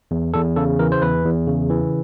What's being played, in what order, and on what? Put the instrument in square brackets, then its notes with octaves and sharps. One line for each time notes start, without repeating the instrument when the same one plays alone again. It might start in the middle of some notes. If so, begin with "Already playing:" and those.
[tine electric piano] E2
E2 A4
C#3 A4
E3 A#4
C5
E2 B4
E2
C#3
E3